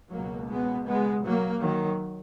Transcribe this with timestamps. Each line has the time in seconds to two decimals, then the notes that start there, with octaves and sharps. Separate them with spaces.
0.12 C#2 B2 F#3 A#3
0.50 G#3 B3
0.87 G#3 B3
1.25 F#3 A#3
1.62 D#3 F#3